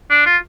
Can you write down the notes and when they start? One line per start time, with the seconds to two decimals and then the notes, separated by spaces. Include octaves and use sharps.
0.10 D4
0.26 F4